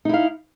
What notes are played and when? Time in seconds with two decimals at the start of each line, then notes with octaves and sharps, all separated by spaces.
0.05 D#4
0.09 E4
0.14 F5